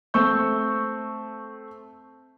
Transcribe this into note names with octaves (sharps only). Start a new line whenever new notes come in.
A3 C4 C#6 E6 G6